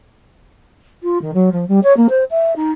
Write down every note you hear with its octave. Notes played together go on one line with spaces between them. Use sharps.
F4
D#3
F#3
F3
G3
C#5
A#3
C5
E5
D#4